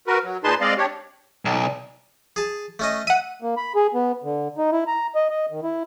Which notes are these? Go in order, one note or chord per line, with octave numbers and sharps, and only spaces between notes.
F#4 A#4 B4
F#3
A#2 D#4 G#4 B4 A5 C6
G#3 C4 D5 D#5 F5
D4 G4 C#5
B1
G#4 A5
A3 C#4 D#5
E5 F#5 D#7
A#3
B5
G#4
B3
D3
D#4
E4
A#5
D#5
D#5
D#3
E4